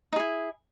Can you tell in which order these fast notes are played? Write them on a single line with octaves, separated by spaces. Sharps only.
D#4 G#4 E4